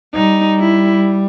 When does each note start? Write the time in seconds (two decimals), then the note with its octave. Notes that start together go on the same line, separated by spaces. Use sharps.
0.14 G3 D#4
0.60 E4